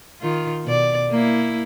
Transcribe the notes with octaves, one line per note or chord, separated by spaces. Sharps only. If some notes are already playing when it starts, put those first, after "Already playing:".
D#3 F4
B2 D5
A#3 E4